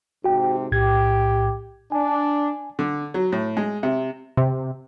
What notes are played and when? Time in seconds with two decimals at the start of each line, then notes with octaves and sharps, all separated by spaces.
0.24 G#2 C3 F#4 G5
0.72 B1 A2 G4 G#6
1.92 D4 G#5
2.79 D3
3.14 F#3
3.32 A2
3.57 G#3
3.83 C3
4.37 C3